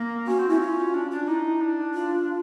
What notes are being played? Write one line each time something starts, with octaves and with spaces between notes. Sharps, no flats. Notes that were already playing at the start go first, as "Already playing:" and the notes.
Already playing: A#3
C#4 F#4
C4
C#4 E4
F4
D4
D4
D#4 E4
D4
F4